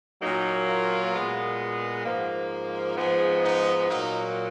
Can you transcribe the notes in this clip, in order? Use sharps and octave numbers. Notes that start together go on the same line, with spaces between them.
A#2 F#3 A#3 D#4
F4
A#2 G#3 B3
G#2 F3 A#3
G#2 F3 B3 G#4
D#4
A#2 F#3 A#3 D#4